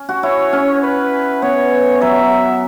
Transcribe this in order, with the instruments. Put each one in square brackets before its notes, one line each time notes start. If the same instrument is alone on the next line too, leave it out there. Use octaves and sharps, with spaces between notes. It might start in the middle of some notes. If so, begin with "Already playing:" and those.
Already playing: [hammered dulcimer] C#4
F#4
[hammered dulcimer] E4 [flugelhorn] C#5
[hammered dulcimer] C#4
[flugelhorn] B4
[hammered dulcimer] B3 [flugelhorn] C#5
[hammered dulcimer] F#3 [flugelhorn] E5